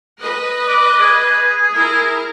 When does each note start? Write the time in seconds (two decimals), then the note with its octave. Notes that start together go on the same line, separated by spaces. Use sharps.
0.21 B4 D#5
0.67 D5
1.00 G#4
1.73 E4 A#4